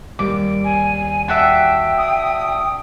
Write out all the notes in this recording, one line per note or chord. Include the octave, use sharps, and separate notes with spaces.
D#2 G3 D6
G#5
D4 F#4 E5 G5
D#6